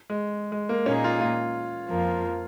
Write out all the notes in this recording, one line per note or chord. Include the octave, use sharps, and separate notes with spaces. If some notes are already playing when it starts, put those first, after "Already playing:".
G#3
G#3
A#3
A#2 A#3 C#4 D#4 G#4
F4
F4
F2 F3 A#3